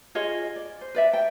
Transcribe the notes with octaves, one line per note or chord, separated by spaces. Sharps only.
F4 G#4 C#5 D#5
D5
C5
B4 D5 E5
G5